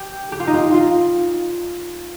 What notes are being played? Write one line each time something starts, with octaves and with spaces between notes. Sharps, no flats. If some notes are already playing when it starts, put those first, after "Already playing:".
Already playing: G4
G4
F4
D#4
F4
F4